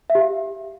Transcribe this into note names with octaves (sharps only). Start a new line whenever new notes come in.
E5
G4
F5